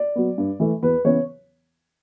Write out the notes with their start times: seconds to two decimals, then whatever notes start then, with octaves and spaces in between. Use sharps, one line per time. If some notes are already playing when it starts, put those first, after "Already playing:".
Already playing: D5
0.15 F#3 B3
0.38 G2
0.60 E3 A3
0.82 E2 B4
1.05 C#3 E3 B3 C#5